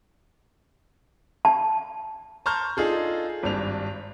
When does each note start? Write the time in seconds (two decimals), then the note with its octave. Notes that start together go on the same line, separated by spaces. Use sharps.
1.45 A5
2.46 A5 A#5 C6 C#6 F6 G6
2.77 D4 D#4 F4 G#4 A4
3.43 G#1 G2 D4 F7